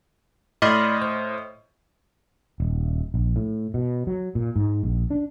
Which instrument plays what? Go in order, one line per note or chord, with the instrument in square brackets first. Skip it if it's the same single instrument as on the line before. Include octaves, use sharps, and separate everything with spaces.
[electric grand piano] A2 D#5 F6 [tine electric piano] D5 B5 C6
[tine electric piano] C5
[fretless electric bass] D#1
A#1
A2
B2
F#3
A#2
G#2
A#1
D4